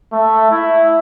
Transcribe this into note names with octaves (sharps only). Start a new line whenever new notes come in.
A3
E4